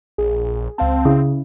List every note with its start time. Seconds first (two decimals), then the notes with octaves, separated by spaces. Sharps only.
0.18 A#1 G#4
0.78 C#2 C4 F5 A5
1.05 C#3 C#4 E4